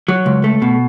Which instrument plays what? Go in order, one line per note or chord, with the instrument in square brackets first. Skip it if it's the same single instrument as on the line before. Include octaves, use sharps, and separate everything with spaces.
[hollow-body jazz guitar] F#3
C#2
A3
B2